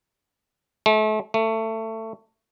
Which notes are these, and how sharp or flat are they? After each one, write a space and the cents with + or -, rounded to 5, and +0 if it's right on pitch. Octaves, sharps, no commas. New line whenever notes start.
A3 -35
A3 +20